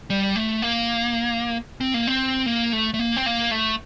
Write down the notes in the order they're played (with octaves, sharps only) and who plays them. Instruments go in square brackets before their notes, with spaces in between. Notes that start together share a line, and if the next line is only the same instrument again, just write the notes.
[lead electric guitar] G3
A3
A#3
C4
A#3
C4
A#3
A3
A3
A#3
C4
A#3
A3